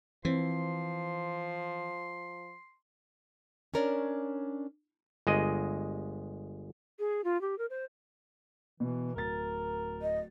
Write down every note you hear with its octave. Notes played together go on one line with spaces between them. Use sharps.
E3 F3 C4 C6
C#4 D4 A#4 C#5 D5
G1 G#3 D#5
G#4
F4
G4
A#4
C5
B2 E3
D1 A#4 A6
D#5